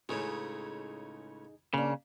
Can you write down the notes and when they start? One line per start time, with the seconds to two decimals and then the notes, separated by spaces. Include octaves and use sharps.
0.09 C#2 A2 C#3 D#4 G#4
1.74 C#3 A#3 D4